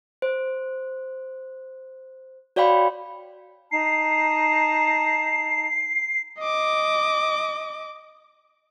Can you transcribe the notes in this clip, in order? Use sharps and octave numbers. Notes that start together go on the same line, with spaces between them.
C5
F#4 C#5 D5 F5 G5 B5
D#4 A5 A#5 C7
D#5 D6